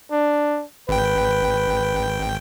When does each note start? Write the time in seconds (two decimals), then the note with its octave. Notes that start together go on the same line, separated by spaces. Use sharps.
0.11 D4
0.89 G#1 B4 G5